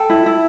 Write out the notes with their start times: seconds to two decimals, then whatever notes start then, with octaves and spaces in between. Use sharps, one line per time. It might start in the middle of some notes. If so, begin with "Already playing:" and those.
Already playing: A4 G5
0.10 E4
0.26 E4